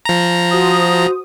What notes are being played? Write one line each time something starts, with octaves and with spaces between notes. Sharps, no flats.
F3 A#5
F#4 C5 D#6